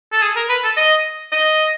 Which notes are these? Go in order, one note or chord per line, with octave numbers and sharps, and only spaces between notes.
A4
G#4
A#4
B4
A4
D#5
D#5